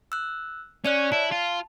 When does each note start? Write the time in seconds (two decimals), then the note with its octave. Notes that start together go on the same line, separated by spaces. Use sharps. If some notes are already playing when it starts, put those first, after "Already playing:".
0.12 E6 F#6
0.85 C#4 C#5 D5 F#6
1.12 E4 A5
1.31 F4